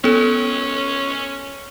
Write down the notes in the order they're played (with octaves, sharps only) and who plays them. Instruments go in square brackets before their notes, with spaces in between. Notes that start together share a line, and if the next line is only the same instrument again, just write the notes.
[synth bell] B3 A4 [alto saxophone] C#4